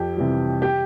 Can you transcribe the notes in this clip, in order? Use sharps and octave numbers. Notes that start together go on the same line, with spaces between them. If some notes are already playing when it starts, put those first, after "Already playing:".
Already playing: F2 G4
C3 E3 G3
G4